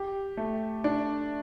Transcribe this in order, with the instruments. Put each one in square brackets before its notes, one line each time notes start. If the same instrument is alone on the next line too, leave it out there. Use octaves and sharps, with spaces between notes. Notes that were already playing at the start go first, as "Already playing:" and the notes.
Already playing: [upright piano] G4
A3
D4